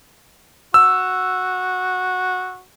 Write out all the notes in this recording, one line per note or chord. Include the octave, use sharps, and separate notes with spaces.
F#4 E6